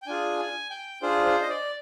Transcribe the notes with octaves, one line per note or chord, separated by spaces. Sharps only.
G5
D4 F4 G#4 G#5
G#5
G5
D4 F4 G#4 C5
C5
D#5
D5